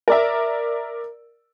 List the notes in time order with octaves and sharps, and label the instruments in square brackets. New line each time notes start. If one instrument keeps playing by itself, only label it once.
[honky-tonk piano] A#4 D5 E5